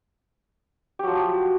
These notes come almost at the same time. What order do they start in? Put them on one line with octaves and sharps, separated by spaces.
G4 F#3 F3